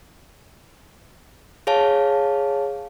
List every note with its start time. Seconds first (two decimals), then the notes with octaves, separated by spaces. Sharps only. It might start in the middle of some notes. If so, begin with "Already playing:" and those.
1.67 G#4 C#5 F5 A5